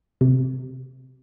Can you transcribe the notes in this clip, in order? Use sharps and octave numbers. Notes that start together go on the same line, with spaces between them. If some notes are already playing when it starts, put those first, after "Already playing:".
C3